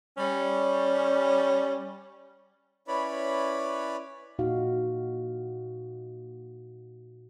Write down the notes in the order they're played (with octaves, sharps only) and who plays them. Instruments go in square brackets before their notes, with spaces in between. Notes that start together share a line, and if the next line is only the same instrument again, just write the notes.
[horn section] G3 C#4
[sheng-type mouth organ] C#4 E4 B4 C#5 D5 B5
[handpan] A#2 D#4 F#4 F5